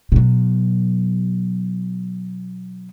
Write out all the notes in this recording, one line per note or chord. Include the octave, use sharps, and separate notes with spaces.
B2 F#3